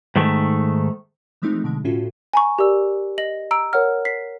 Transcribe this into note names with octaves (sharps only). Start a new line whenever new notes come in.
G#2 D#3 A3
E3 F3 G#3 A3 C4 D#4
B2 D3 G#3
A2 C#4 F4 F#4 A4
G#5 A#5 C#6
G4 A#4 D5 E6
D#5 A#6 F#7
A#5 E6 D7
A#4 C#5 F#5 F6
B6 C7